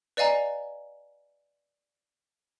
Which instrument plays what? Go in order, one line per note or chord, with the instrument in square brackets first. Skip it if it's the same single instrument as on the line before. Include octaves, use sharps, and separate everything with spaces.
[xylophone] B4 D5 D#5 F5 G#5 A#5